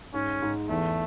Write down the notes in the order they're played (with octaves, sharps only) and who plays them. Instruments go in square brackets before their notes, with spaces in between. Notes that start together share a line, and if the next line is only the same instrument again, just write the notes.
[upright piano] G#2 [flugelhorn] C#4
[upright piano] G#2
[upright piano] E2 [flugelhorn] A3